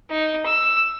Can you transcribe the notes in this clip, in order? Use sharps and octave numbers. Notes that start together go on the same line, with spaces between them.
D#4
E6